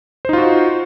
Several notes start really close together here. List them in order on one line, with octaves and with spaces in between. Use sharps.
C5 D#4 F4 F#4